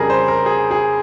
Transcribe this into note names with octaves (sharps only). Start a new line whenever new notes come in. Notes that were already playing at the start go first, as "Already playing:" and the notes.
Already playing: F2 C#3 G3 G#4 A#4
C5
A#4
G#4
G#4